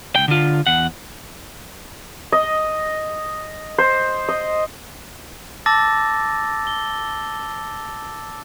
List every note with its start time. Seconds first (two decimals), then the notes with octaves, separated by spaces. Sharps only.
0.15 C#2 G5
0.28 D3 F4
0.67 E2 F#5
2.32 D#5
3.78 C5
4.29 D#5
5.66 A5 D6 E6 A6 A#6
6.67 G7